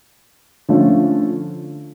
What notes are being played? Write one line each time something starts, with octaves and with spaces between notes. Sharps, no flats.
D3 F3 A3 C#4 F4